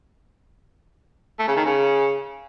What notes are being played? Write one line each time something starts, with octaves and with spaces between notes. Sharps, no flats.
A3
C#3
D#3
C#3